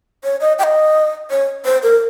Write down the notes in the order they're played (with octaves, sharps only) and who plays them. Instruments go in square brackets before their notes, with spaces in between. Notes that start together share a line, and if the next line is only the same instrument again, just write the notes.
[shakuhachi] C#5
D#5
G5
D#5
C#5
C5
A#4